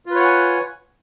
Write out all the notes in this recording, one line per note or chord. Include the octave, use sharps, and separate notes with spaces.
F4 B4 C#5 F#5 G#5